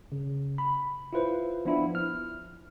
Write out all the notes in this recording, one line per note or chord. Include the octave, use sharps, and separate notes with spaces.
C#3
B5
E4 F4 B4 C5
F3 B3 D4 E4 F4
F6